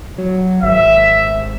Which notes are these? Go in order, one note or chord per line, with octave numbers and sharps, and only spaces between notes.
F#3
G#1 E5